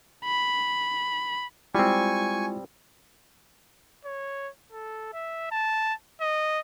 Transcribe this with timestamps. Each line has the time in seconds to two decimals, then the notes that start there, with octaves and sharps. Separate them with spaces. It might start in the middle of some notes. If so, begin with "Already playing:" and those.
0.25 B5
1.75 G3 G#3 C4 E4 F4 G#5 C#6
4.05 C#5
4.72 A4
5.13 E5
5.51 A5
6.21 D#5